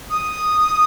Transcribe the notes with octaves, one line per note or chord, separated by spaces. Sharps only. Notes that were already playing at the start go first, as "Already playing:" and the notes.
D#6